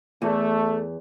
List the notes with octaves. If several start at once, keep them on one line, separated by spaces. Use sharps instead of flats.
E2 A3